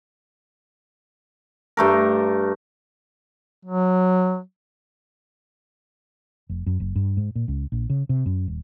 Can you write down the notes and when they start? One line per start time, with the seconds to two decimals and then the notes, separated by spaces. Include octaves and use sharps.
1.77 G2 A3 A#4
3.65 F#3
6.49 F1
6.66 F#2
6.80 F#1
6.96 G2
7.17 G#2
7.35 A#2
7.48 C#2
7.72 A#1
7.90 C#3
8.09 C3
8.26 F#2
8.48 D#1